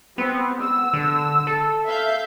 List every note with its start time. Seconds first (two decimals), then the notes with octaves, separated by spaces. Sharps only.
0.18 B3 C4
0.60 E6
0.94 D3
1.47 A4
1.86 E5 F5 G6